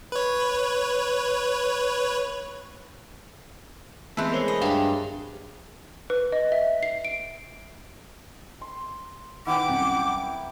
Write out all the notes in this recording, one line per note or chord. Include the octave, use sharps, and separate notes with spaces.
B4 C#5
E3 G#3 A3 B3 C4
A#4 C5 C#5
D#5
G2 F5 G5 A5 B5
B4
D#5
E5
C7
D7
C6
D#3 E4 B4 F#5 G5 D6
C2 F#2